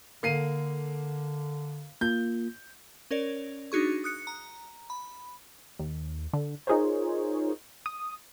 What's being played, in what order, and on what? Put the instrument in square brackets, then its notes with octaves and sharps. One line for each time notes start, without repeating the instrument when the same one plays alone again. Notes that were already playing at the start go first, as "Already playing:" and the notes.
[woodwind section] D3 [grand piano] A#3 C7 D#7
[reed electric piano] A#3 F4 [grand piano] G6
[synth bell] C#4 A#4 C#5 D5
D4 D#4 F#4 G#4 C#6
D#6 F#6 C#7
A#5
B5
[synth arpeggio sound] D#2
D3
D#4 F4 G#4 A#4 C5 C#5
D#6